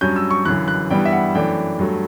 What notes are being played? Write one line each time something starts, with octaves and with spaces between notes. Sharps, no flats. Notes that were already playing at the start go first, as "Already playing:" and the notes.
G2 F#3 C#4 G6
E6
C#6
G1 F#2 E3 F#6
F#6
G2 E3 G3 B3 G5
E5
F#5
F#2 E3 A3 D4 G5
G2 F#3 A3